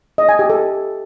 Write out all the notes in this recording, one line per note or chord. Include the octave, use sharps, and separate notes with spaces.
D#5
G#5
G4
A4